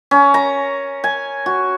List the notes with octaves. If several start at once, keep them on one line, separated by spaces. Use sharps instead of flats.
C#4
A#5
G#5
F#4